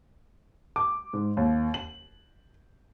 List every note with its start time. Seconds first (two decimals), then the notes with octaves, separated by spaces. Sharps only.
0.76 D6
1.13 G#2
1.37 D#2
1.74 F#7